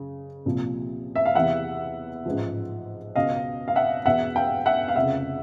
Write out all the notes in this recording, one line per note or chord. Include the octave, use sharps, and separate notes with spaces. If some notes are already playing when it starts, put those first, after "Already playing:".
Already playing: F#1 C#3
C2 A#2 F3
E5
F5
E2 C3 E3 E5 F#5
A1 G#2 F3
C#2 B2 D#5 F5
F5
E5 F#5
E2 B2 E5 F#5
F5 G5
E5 F#5
F5
F1 F2 C#3 E5 F#5